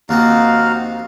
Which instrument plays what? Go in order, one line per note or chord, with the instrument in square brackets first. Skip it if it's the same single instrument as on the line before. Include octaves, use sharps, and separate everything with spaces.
[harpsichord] D#2 F3 C4 [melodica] D#4 F#4 F5